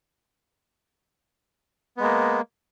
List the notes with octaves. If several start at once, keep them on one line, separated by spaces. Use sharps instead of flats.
G#3 A#3 B3